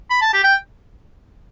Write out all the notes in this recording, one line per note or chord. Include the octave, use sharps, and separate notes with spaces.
B5
A5
G4
G5